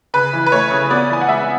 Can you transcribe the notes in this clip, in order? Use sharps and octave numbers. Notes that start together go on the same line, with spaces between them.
C#3 B4
E3
B4
A3 C#5
C#3
B3 D5
E3 G#5
F#5
G#3 E5